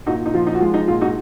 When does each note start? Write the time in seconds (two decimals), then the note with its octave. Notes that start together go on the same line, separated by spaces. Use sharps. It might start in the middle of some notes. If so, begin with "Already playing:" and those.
0.06 A#2 D#4 F#4
0.26 D#4
0.34 F3 F4
0.47 D#4
0.54 F#4
0.60 G#3 F4
0.74 D#4
0.88 A#2 F4
1.01 D#4 F#4